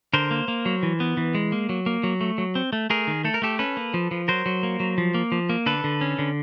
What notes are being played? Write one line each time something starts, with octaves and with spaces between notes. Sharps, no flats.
D3 A#4 C5
A#3
A#3
F#3
E3
B3
E3
G#3
A#3
F#3
A#3
F#3
A3
F#3
C4
A3
A3 G#4 A#4
D#3
A3 A4
A#4
A3 G4 A4
C#4 A4 B4
A#3
F3
F3
F#3 A#4 C5
F#3
A#3
F#3
F3
A#3
F3
A#3
D3 A4 B4
D3
C#4
D3